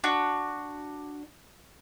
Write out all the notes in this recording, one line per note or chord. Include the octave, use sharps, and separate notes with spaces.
D4 F#4